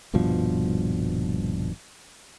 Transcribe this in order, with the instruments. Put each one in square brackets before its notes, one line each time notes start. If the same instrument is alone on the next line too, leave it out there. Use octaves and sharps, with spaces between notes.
[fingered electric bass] D#1 G2 B2 F3